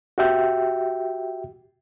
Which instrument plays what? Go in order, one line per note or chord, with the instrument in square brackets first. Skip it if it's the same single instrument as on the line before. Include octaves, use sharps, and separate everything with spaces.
[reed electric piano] F#4 G4 E5 G5